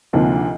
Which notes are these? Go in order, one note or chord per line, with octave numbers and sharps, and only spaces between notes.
D2 C3 F3 A#3 D#4